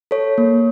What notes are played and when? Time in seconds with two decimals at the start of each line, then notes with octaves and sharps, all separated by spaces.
0.11 A4 C#5
0.38 A#3